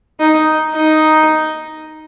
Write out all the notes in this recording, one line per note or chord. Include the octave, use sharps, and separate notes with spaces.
D#4
D#4